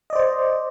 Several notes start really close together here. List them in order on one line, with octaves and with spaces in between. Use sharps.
D#5 D5 C5